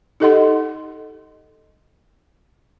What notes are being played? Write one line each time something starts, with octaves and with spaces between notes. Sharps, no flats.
D#4 G4 A4 D#5 F#5 C6